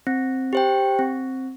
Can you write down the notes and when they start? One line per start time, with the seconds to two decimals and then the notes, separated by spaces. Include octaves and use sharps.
0.07 C4
0.53 G4 C5 G5
0.99 C4